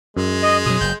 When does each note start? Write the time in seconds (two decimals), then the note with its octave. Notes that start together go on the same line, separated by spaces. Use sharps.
0.17 F#2 G#3
0.42 D#5
0.66 B2 F#3 D#6
0.81 F#1 F#2 G6